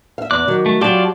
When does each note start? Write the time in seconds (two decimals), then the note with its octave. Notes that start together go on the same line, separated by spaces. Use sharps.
0.18 E5 F5
0.31 E2 D6 F#6
0.48 D#3 F#3
0.66 A3
0.81 F#3 F4 G4 D5 A5